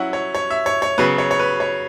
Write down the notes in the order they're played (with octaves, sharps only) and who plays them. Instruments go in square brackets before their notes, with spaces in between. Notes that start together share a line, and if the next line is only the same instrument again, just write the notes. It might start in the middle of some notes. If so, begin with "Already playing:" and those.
Already playing: [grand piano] F#3 C#4 E4 F#5
C#5
C#5
E5
C#5
C#5
C#3 F#3 B3 B4
C#5
C#5
B4
C#5